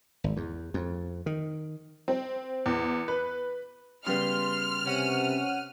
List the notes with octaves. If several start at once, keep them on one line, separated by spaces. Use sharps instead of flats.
G#1
E2
F2
D#3
C4
E2
B4
C#3 G3 B3 C6 F6
C3 C#4 F#5 D#7